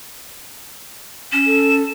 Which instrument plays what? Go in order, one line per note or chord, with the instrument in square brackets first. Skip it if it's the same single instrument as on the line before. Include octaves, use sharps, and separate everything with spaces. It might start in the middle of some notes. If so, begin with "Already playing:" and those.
[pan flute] C#4 [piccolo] E7
[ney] A4